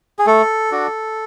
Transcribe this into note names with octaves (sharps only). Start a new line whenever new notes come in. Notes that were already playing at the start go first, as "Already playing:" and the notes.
G#4
A3 A4
D4 F#4